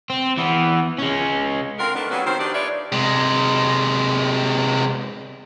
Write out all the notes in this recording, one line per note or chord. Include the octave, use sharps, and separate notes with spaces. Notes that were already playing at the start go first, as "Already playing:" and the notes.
C4
E3 B3
G#3 C#4
D3 C4 F4 A#4
D#3 A3 B3 D4
F#3 G3 A#3 B3 C#4 D4
D#3 A#4 C5
D4 D#4 G4
F4 A4 B4 C#5 D5 E5
C3 G#3